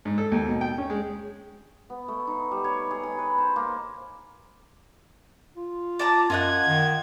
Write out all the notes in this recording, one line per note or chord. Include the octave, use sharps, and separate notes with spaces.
G#2
A4
D#2
B2
G5
C#4
G#3
B3
A3
D#4
G3
C#5
G#4
B5
B4
C5
A#3
F4
D5 A5 A#5
F#2 F4 D#5 F#5 G#6
D#3